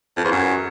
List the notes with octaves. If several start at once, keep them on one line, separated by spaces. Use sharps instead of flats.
F2
E2
F#2